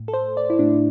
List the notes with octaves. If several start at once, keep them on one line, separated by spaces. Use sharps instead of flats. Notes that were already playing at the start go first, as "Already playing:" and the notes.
Already playing: A2
A4
C5
D5
E4
A2 A3 D4